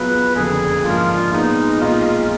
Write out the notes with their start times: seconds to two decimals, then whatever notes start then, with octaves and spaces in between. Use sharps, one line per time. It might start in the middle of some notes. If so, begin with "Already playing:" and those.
Already playing: B2 F#3 B3 F4 G#4 B4
0.35 F#1 F2 D3 G#4
0.84 G#2 F3 A#3 D4 F4
1.32 A#2 G#3 B3 D#4
1.81 B1 A#2 G#3 D#4 F4